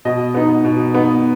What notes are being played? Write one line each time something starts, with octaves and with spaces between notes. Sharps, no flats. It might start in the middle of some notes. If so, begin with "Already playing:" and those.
B2 D#5
B3 D#4
B2
B3 D#4